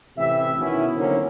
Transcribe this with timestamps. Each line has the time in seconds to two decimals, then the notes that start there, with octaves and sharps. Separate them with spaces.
0.16 A1 C3 E3 G4 E5
0.57 B2 D#3 B3 C#4 E4
0.96 D3 D#3 F#3 A#3 C4 C#4